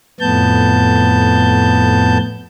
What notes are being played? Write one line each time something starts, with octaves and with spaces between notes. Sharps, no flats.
F2 A2 B3 A5 G6